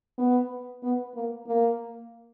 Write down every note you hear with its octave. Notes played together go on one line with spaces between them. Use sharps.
B3
B3
A#3
A#3